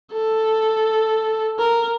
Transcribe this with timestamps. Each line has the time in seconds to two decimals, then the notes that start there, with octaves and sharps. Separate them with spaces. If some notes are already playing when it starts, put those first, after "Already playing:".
0.14 A4
1.59 A#4